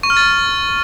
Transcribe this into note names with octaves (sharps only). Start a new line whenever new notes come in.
C#6
F6
A6